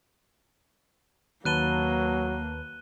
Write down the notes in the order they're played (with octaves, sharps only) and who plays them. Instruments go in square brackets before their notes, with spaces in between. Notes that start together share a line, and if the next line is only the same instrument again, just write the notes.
[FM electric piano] D#2 B4 A5 [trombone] F#3 [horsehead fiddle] A#3 [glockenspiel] F#6 D#7 G7